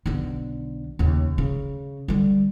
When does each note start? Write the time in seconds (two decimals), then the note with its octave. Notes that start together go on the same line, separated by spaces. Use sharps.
0.06 B1 D3
0.99 D#2 C#3
1.38 C#3
2.08 D3 G3